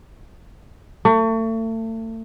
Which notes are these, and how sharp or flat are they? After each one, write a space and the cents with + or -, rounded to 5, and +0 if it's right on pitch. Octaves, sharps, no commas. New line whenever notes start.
A3 +35